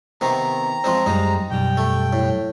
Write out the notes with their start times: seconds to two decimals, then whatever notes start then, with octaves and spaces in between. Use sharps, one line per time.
0.21 C3 D#3 B3 C4 A#5
0.84 F3 G#3 C4 C5 C6
1.06 F#2 G3 G#3 D#4
1.51 B1 F#2 G3 G5
1.77 A3
2.13 A2